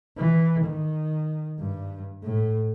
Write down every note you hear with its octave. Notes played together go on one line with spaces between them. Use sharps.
E3
D#3
G2
A2